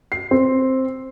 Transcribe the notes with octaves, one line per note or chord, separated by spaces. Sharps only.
C7
C4